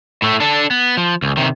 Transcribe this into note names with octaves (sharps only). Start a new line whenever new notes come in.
A2 A3
D4 A4
B3
F3
C#2
C3 D#3